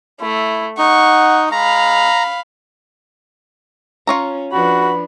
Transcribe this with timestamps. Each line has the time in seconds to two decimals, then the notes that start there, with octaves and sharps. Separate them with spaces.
0.21 A3 E4
0.78 D#4 F#5 C#6
1.52 G#3 F5 A#5 B5
4.07 C#4 F4 C#5 A#5
4.53 F3 D4 F#4 B4 B5